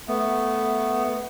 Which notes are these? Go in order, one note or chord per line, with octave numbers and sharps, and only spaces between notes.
A3 B3